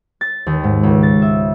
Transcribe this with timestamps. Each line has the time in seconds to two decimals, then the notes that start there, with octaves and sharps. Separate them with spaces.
0.21 A6
0.47 D#2
0.64 G#2
0.83 C#2
1.03 A6
1.22 E5